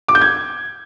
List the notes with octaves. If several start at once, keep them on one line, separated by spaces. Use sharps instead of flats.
D6
G6
G#6